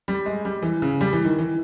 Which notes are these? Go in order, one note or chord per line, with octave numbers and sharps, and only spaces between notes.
G3
G#3
G3
E3
C#3
G3
E3
D#3
E3